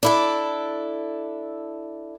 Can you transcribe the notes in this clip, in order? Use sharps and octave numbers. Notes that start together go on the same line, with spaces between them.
D4 E4 A4